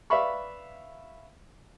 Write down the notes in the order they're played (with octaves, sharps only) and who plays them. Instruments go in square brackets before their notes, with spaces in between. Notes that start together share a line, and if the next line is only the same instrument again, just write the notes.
[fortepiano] B4 D5 E5 F5 B5 C#6